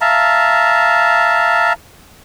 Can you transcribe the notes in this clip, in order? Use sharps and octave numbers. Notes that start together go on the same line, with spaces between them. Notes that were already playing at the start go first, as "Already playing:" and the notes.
E5 F5 A5 A#5